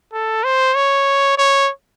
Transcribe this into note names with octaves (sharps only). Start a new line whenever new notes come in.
A4
C5
C#5
C#5